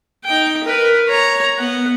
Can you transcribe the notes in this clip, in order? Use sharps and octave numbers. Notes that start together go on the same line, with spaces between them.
D#4 G5
A#4 B4
C#5 A#5
B3 F#5